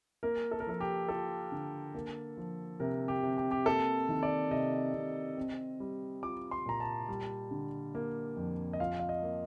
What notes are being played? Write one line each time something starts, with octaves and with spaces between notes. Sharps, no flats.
A#3 A#4
A4
A#4
F3 A4
G4
F4 A4
D3
A#3
F3
C3 A#4
G4
C3
G4
G4
A#3 A4
D#3
D5
C3 D#5
C3
C4
G3
F4 D6
C6
A#2 A#5
A5
G3
D3
A#3
F2
D#5
F4 F5
F5
D#5
A#3